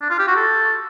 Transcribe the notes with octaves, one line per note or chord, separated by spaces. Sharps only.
D4
F4
G4
F#4
A4